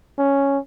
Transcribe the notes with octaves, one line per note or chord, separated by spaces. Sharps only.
C#4